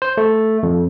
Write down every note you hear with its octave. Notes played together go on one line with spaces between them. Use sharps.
C5
A3
F2